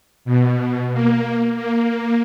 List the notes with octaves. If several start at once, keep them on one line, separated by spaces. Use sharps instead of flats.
B2
A#3
A#3